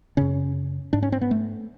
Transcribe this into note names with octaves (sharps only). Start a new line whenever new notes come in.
F#2 C#3 C#4
G#2 D4
C#4
C4
B3
A3